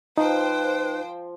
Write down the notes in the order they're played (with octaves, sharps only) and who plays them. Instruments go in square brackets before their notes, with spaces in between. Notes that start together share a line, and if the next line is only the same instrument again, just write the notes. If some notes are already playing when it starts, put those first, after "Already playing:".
[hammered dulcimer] F3 F4 [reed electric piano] D#4 [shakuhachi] B4 [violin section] C5 G5